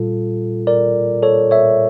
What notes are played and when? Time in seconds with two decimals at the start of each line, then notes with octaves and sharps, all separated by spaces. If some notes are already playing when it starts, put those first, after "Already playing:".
Already playing: A#2 G3 F4 A4
0.67 A#4 D5
1.23 A4 C#5
1.51 C#5 E5